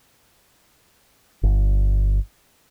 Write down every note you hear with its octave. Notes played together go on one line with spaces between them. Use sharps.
G1